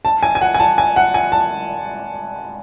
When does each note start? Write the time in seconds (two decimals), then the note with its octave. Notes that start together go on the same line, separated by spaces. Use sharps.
0.05 A5
0.23 G#5
0.35 G#5
0.41 F#5
0.54 G#5
0.60 A5
0.78 G#5
0.96 F#5
1.14 G#5
1.32 A5